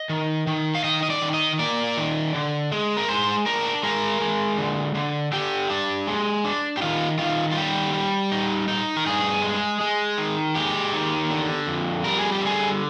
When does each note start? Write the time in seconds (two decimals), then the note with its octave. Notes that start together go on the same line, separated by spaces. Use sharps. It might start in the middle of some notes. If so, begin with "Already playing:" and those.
Already playing: D#5
0.09 D#3
0.47 D#3
0.75 F5
0.84 D#3 D#5
1.03 D#5
1.10 D5
1.22 D#3
1.34 D#5
1.59 A#3 D5
1.97 D#3
2.35 D3
2.72 G#3
2.97 A#4
3.08 G#3 C5
3.46 D4 A#4
3.83 G#3 A#4
4.20 G#3
4.58 D3
4.95 D3
5.32 D3 G4
5.70 D4
6.07 G#3
6.45 D4
6.77 G4
6.82 D#3 F4
7.19 D#3 F4
7.52 F4
7.57 G3 G4
7.93 G3
8.32 D#4
8.68 D#4
8.97 A#4
9.06 G2 G#4
9.43 G#3
9.81 G#3
10.18 D#3
10.55 G#3 G4
10.93 D#3
11.30 D3
11.67 F2
12.04 G3 A#4
12.18 G#4
12.32 G4
12.41 D3 G#4